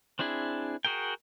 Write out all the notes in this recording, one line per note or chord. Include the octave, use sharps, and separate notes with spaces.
C4 D4 E4 G#4
F#4 G#4 A#4 G5